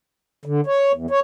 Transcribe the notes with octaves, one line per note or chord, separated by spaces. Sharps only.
D3
C#5
E2
C#5